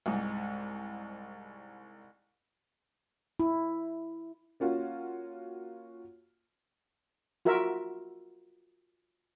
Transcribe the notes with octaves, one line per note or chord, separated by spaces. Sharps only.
C2 G#2
E4
A#3 C#4 F4 F#4
F4 F#4 A#4 E5